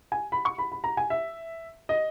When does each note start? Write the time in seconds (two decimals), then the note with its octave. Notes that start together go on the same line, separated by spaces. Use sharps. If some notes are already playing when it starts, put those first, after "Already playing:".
0.12 G#5
0.32 B5
0.45 C#6
0.58 B5
0.72 B5
0.84 A#5
0.97 G#5
1.10 E5
1.89 D#5